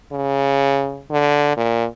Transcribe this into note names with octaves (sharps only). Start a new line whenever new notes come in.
C#3
D3
A#2